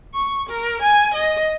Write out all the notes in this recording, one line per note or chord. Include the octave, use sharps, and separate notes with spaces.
C#6
A#4
G#5
D#5